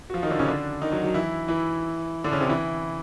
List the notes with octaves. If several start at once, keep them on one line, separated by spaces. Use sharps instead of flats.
F#4
F3 F4
D#3 D#4
D3 D4
C#3 C#4
D3 D4
D#3 D#4
F#3 F#4
F#3 F#4
E3 E4
E3 E4
D3 D4
C#3 C#4
C3 C4
E3 E4